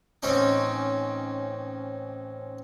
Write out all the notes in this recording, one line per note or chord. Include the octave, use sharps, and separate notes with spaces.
A1 C4 C#4 D#4 D6